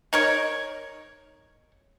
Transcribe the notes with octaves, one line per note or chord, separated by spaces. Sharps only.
D#4 A#4 C#5